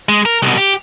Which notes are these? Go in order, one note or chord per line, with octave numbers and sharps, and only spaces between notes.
G#3
A#4
C2 B2
G4